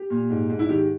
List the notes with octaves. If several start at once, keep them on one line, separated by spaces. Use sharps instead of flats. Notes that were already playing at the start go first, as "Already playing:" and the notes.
Already playing: G4
A#2
G#2
G#2
E4
D#3 G4